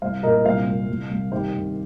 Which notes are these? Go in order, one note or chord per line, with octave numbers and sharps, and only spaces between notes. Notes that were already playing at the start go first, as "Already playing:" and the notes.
C2 C5 F5
A#2 A#4 D#5
C2 C5 F5
C2
C2
C2
D#3 G4 C5
C3